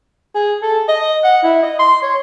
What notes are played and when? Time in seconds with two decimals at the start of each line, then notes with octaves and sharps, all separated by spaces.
0.35 G#4
0.62 A4
0.89 D#5
1.24 F#5
1.43 E4
1.63 D#5
1.79 C6
2.02 C#5